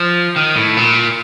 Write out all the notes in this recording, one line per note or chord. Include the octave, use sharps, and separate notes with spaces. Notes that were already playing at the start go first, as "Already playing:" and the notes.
Already playing: F3
D#3
A2
A#2